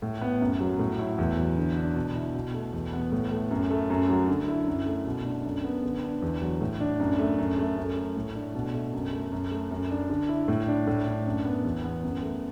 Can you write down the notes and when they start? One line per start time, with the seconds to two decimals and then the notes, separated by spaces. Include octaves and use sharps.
0.02 A2
0.21 B3
0.41 F#2
0.61 F#3
0.79 A2
0.99 E4
1.18 E2
1.38 F#3
1.57 D3
1.77 D4
1.96 B2
2.15 E4
2.35 B2
2.54 A3
2.73 E2
2.93 B3
3.12 A2
3.31 A3
3.51 F#2
3.70 A3
3.90 F#2
4.09 F#3
4.28 D3
4.48 E4
4.67 F#2
4.86 A3
5.06 B2
5.25 D4
5.45 F#2
5.64 B3
5.83 D3
6.03 D4
6.22 E2
6.42 F#3
6.61 A2
6.80 D4
7.00 F#2
7.19 A3
7.38 F#2
7.58 A3
7.77 F#2
7.96 A3
8.16 A2
8.35 D4
8.55 B2
8.74 A3
8.93 F#2
9.13 A3
9.32 F#2
9.51 A3
9.71 F#2
9.90 D4
10.10 D3
10.29 E4
10.48 A2
10.68 D4
10.87 A2
11.07 D4
11.26 F#2
11.45 B3
11.64 E2
11.84 B3
12.03 F#2
12.22 A3